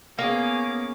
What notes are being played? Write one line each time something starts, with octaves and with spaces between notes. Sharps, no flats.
A#3 B3 C#4 G#4 D6